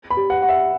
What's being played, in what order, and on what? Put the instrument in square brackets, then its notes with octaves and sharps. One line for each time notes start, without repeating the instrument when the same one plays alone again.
[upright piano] B5
[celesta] G4
[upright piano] F#5
[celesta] F#5
[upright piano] E5